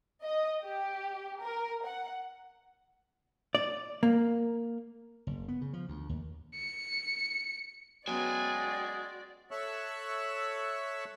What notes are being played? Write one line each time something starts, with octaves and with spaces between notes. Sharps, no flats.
D#5
G4
A#4
F#5
D5
A#3
F#1
B3
C#3
F3
D2
D#2
C#7
F#3 G#3 B3 C#4 F#4 D5 G5 G#5
A4 C#5 E5 C#6 E6 F#6